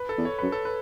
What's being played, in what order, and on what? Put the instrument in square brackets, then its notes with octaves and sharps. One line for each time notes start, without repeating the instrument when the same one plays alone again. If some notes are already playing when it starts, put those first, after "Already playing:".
Already playing: [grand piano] B4
A4
[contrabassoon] E2
[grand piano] C#5
[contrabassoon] F#2 [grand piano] B4
[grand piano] A4
B4